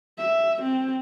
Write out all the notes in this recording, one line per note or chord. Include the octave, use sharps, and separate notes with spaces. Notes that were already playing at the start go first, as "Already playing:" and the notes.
E5
C4